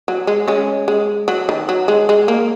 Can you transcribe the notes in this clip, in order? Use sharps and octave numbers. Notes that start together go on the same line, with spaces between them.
F#3
G#3
G#3 C#4
G#3
F#3
D#3
F#3
G#3
G#3
A#3